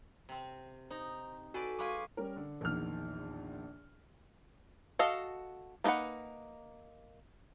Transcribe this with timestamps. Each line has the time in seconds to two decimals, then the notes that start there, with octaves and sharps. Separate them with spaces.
0.29 C3 C4
0.91 D#4 C5 A#5
1.54 F#4 A4 B4 D5 G#5
1.79 G#3 B4 F5 G#5 C#6 D6
2.17 G3 C#4 A#4
2.36 D3
2.61 A#1 E2 D#3 F6
4.99 F#4 A4 D#5 F5
5.84 A#3 D#4 A#4 B4 F#5